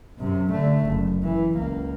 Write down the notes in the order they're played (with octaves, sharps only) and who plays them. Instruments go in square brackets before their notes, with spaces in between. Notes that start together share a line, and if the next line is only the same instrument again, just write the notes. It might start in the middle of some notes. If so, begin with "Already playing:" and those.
[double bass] F#2 C3
D3 A3
F#1
E3
C#2 A#3